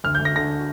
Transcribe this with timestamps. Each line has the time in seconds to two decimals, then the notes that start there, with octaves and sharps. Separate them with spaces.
0.04 D2 F6
0.15 G6
0.20 D2
0.25 A#6
0.36 D3 A#6